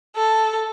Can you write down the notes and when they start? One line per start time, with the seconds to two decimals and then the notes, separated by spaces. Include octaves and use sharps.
0.16 A4